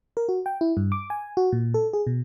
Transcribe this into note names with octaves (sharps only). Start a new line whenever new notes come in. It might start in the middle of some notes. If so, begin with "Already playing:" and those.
A#4
F#4
G5
E4
G2
D6
G#5
F#4
A#2
A4
G#4
B2